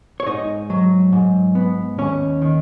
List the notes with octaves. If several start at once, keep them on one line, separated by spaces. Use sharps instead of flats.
C#5
G#2 D#4 D#5
F#3
G#2
B3
D#2 C#4 C#5
D#3